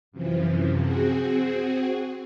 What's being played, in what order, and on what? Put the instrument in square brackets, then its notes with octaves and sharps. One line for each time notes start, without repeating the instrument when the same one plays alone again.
[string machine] F#2 C3 E3 F3
C4 F#4 G#4